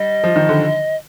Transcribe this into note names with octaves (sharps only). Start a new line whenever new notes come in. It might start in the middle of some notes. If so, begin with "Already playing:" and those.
Already playing: G3 D#5
F3
D#3
D3